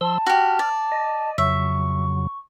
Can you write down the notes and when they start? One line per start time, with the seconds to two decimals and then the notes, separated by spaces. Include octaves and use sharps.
0.01 F3 A5 C6 E6
0.26 F#4 G4 F6
0.59 D5
0.92 D#5
1.38 F2 C#3 F#3 E5 C#6